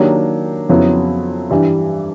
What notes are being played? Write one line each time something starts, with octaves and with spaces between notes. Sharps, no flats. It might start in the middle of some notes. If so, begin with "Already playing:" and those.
Already playing: D#3 F#3 A#3 D4 G4
F2 C#3 F#3 B3 E4
G2 E3 G3